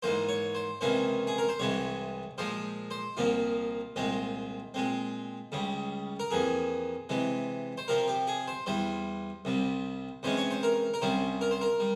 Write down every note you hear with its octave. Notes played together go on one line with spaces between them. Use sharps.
G#2 E3 A#3 C5
C#5
C5
C#2 C3 E3 A#3 C#4 C5
G#4
A#4
C5
C2 C3 E3 G#3 C#5
A#2 F3 G#3 C5
C5
C2 A#2 F3 A#3 F4
C2 A#2 G#3 C4
A#2 G#3 C4
C#2 C#3 G3
A#4
F2 E3 A#3 G#4
C3 E3 G#3
C5
C3 F3 C4 A#4
G4
G#4
C5
E2 E3 G3 C5
C2 C3 G3
C3 E3 G#3 C#4 C5
C#5
C5
A#4
A#4
C2 C3 G3 C#4 C5
A#4
C5
A#4
G3